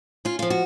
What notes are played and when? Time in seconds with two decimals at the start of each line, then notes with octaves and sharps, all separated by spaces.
0.25 C#4 F4
0.39 F3 F4
0.50 F#4